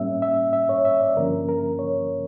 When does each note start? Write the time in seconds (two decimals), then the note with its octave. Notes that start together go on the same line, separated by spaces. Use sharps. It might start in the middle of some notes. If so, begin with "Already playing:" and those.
Already playing: A2 G3 A#3 C#4 E5
0.22 E5
0.53 E5
0.69 C#5
0.85 E5
1.01 D5
1.16 G2 D3 F3 A#3 C#4 A#4
1.49 A#4
1.79 C#5